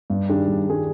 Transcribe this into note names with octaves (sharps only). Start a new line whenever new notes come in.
G2
D#3 G3 D4 G#4
G2
D#3 G3 D4 G#4